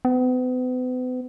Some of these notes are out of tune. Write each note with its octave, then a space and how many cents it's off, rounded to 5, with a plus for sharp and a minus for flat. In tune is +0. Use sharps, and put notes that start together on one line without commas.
B3 +40